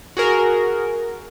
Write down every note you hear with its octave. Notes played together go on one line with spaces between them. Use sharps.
F#4 G#4 A#4